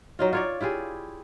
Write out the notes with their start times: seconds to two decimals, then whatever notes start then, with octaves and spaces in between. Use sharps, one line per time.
0.19 F#3 D#4 F4
0.33 F4 C#5 D5
0.61 E4 F4 G4 G#4